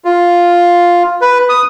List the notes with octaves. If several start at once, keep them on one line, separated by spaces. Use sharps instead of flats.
F4
B4
D#6